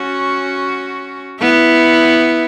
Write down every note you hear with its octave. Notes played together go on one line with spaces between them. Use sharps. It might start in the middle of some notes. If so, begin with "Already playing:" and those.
Already playing: C#4 F#4
B3 E4